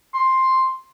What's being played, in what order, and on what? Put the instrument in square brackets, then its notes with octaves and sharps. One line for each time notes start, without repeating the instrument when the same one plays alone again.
[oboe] C6